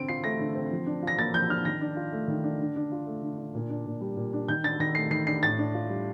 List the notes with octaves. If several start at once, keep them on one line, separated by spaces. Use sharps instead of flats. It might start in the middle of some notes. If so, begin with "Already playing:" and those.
Already playing: D3 C4 D7
F4 C7
A3 A#6
D3
C4
F3
D4
F4 A#6
A#3 A6
F3 G6
D4 F6
D#3 A#6
D4
F4
A3
D#3
D4
D3
D4
F4
A3
D3
D4
A#2
D4
A#2
G3
A#2
D4
D#3 G6
D4 A6
D#3 A#6
A3 C7
D#3 C7
D4 C7
A2 A6
D4
F4
G3